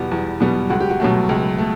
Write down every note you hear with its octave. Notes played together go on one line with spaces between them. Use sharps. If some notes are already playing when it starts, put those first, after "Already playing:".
Already playing: E2 B2 G3 B3
E2
B2 G3 B3
C#2 F#4
G4
F#4
B2 F#3 A3
C#2
A3